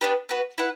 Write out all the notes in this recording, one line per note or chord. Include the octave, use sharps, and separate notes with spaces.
B3 D4 G4 B4
B3 F#4 B4
E4 B4 F#5